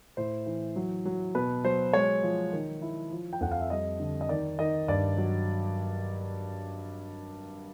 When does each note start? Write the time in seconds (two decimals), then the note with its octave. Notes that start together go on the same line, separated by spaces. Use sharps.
0.17 A2 C5
0.46 E3
0.76 F#3
1.05 F#3
1.35 B2 B4
1.64 F#3 C5
1.93 G#3 C#5
2.23 F3
2.52 D#3
2.82 E4
3.12 F3
3.33 G5
3.41 F2 F#5
3.51 F5
3.61 E5
3.70 G3 D#5
4.00 D3
4.21 D#5
4.29 D#3 D5
4.59 D#3 D#5
4.88 G2 D5
5.18 F#3